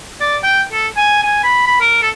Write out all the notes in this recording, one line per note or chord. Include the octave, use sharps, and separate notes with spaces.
D5
G5
A4
G#5
G#5
B5
B5
A#4
A4